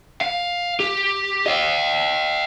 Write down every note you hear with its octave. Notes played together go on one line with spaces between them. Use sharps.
F5
G4
D#5 F5